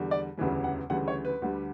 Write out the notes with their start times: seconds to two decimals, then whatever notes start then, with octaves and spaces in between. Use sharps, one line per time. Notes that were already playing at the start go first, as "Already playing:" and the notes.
Already playing: E2 D3 G3
0.11 D5
0.37 E1 D2 C#3 E3 G3
0.64 F#5
0.90 D2 C#3 E3 G3 F#5
1.08 C#5
1.25 B4
1.42 D2 D3 G3